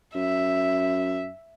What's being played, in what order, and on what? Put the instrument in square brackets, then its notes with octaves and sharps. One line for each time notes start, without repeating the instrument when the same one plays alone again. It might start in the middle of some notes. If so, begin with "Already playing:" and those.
[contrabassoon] F#2 [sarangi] E5